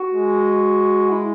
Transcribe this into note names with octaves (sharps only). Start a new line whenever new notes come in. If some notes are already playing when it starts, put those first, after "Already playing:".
Already playing: F#4
G#3
E4